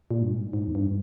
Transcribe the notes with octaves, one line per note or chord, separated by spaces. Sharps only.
A#2
G2
G#2
G#2
E2
G2